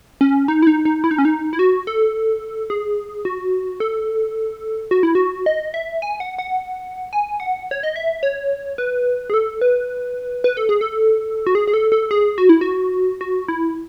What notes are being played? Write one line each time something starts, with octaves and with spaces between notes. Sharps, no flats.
C#4
D#4
E4
D#4
D#4
E4
D#4
C#4
D#4
E4
F#4
A4
G#4
F#4
A4
F#4
E4
F#4
D#5
E5
G#5
F#5
F#5
G#5
F#5
C#5
D#5
E5
C#5
B4
G#4
A4
B4
B4
A4
G#4
A4
F#4
G#4
G#4
A4
A4
G#4
F#4
E4
F#4
F#4
E4